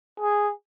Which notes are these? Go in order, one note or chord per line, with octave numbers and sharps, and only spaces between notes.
G#4